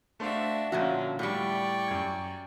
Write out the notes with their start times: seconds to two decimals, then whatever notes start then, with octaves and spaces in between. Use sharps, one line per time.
0.20 A3 D4 F#4 C5 E5 F5
0.72 A#2 D3 F3 C#4 F4 F#4 E5 A#5
1.19 A2 G3 D5 G5 C#6
1.88 F#2 G#6